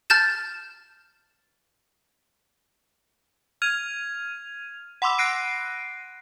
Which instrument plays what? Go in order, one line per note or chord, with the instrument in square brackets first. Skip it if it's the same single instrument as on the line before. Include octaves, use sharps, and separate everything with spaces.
[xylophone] A5 F6 G6 A6 E7
[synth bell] F6 G#6 D#7 F7
F#5 B5 C6 D6 E6
F#6 A#6 C7 D7 D#7